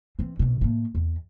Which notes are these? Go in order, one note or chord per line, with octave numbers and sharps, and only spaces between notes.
E3 C4
A#1 B2
A2 A#3
E2